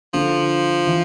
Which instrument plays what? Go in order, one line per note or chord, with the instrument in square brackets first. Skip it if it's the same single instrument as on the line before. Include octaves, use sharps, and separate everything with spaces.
[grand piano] D3 [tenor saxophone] F3
[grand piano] E3